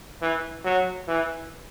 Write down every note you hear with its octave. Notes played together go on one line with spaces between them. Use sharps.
E3
F#3
E3